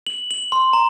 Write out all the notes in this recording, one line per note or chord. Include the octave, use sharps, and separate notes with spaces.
F#7
F#7
C6
A#5